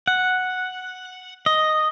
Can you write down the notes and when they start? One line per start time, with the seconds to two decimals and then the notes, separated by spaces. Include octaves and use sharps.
0.07 F#5
1.46 D#5